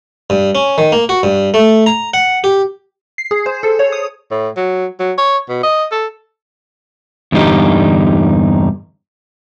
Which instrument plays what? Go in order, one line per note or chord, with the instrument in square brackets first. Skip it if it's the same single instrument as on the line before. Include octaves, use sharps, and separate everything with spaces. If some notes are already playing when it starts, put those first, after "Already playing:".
[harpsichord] G2
C#4
D#3
A#3
F#4
G2
A3
A#5
F#5
G4
[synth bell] C7
G#4
C5
A4
C#5
D#6
[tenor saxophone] A2
F#3
F#3
C#5
B2
D#5
A4
[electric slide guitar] E2 G2 D3 D#4 G4